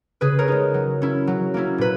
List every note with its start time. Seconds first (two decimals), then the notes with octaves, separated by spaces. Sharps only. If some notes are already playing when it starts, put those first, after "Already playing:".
0.21 C#3 G#4 B4
0.39 A#4 C#5
0.48 G#3 D#4
0.74 F#3
1.02 C#4 E4
1.27 F#3
1.54 A#3 C#4 E4
1.78 A#2 B4